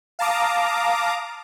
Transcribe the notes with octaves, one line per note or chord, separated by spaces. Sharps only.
F5 A5 A#5 D6 D#6